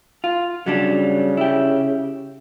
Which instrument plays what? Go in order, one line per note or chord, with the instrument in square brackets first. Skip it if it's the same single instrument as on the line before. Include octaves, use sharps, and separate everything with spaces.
[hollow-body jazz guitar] F4
[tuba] C#3 [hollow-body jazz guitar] F#3 G3 D4
[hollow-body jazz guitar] E4 G4